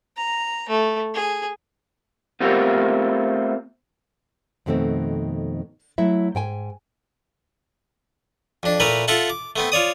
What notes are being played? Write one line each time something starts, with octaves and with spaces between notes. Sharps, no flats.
A#5
A3
G#4
A3 B3 C4 F4 G4 A#4
F2 B2 D#3 A3 B3 C4
F#3 A3 E4 E5
G#2 G5 G#5
F2 D4
A#2 A3 E4 A#4 B4
F4 A4 E5 F#5 A5
D6
A3 B3 C4
F4 C#5 D5 D#6